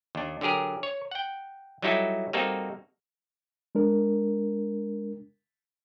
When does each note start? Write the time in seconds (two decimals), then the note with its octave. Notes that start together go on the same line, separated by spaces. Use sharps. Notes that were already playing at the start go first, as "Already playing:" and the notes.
0.15 D#2 D4
0.41 D3 F#3 G4 G#4 A#4
0.83 C#5
1.11 F#5 G5
1.82 F#3 G3 D#4 E4 F#4 A4
2.33 G3 A#3 C4 D#4 F#4 A4
3.75 G#3 D4 A#4